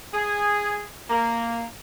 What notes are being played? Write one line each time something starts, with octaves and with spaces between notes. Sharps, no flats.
G#4
A#3